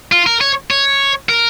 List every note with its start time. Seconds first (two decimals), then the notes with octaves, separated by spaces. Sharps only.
0.12 F4
0.27 A#4
0.41 C#5
0.70 C#5
1.29 A#4